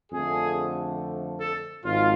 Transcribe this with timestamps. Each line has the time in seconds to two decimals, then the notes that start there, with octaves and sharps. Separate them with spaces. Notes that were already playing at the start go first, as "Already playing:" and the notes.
0.11 F2 D3 F3 A3 G#4
1.41 A4
1.83 G#1 G#2 F3 F4